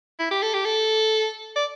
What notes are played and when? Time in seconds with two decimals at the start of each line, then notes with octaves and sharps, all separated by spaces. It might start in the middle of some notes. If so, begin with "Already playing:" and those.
0.20 E4
0.31 G4
0.42 A4
0.54 G4
0.65 A4
1.56 D5